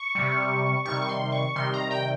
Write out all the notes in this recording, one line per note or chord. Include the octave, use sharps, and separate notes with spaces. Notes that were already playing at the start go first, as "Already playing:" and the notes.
Already playing: C#6
C3 G3
C3 D#3 G3 C#6
C#6
C6
C#6
C3 D#3 G3 C6
A#5
G5